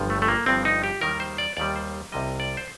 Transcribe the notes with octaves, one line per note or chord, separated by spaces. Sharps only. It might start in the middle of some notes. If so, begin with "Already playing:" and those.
Already playing: G1 G2 F3
A3
A3
A#3
G1 G2 F3 C4
D#4
G4
D#2 D#3 G3 A#4
C5
D5
D#2 D#3 G3 D5
C5
C2 C3 G3 D#5
D5
C5